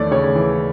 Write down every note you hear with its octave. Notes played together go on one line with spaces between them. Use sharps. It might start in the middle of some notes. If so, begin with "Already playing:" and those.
Already playing: D#2 E3 A3 C#5 D5
C#3 C#5
E3